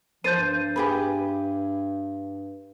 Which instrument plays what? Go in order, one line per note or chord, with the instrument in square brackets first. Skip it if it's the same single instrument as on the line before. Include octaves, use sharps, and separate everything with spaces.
[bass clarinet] F3 [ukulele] C5 [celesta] G6 A6 D#7
[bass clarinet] G2
[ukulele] G4 G#4 B4